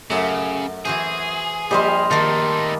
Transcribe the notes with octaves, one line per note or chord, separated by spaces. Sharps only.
F#2 C#3 F#3 A3
E3 F#4 G#4 C5
A#1 G3 G4 C5 D#5 F5 C6
D#3 A3 A#3 D#4 A5